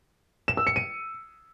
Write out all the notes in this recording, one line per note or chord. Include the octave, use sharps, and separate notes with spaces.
E7
E6
C#7
D#7